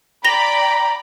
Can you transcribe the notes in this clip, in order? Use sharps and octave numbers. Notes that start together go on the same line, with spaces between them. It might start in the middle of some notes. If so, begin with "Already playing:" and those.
D5 G5 A#5 B5 A#6 F7 G7